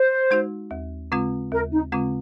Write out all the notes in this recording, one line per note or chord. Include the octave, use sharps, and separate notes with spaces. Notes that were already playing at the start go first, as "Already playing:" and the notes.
Already playing: C5
G#3 D#4 F#4
D#2
C#3 G#3 C4 F4
D#2 A#4
D#4
C#3 G#3 C4 F4